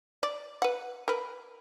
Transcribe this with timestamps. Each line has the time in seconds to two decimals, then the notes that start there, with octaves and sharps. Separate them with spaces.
0.23 D5
0.62 B4 F#5
1.08 A#4 B4